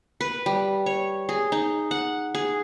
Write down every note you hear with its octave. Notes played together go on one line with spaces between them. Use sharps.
B4
G3
C#5
G#4
D#4
F#5
G#4